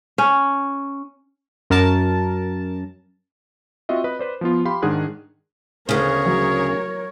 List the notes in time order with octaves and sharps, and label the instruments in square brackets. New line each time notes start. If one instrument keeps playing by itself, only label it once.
[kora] C#4
[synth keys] F#2 A#4 A5
[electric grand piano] C4 F4 F#4 D#5 E5
B4 D#5 B5
B4 C5 D5
F3 B3 F4
G4 F5 B5 C6
G#2 D#3 D4 G#4 F#5 F#6
[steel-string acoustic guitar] D2 C#3 [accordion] G#4 [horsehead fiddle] A#4 C#5
[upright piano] F#3